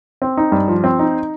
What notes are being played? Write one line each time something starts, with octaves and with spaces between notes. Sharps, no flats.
C4
D#4
G2
F3
C4
D#4